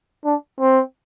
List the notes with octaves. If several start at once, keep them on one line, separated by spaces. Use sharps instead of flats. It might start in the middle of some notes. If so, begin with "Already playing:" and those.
D4
C4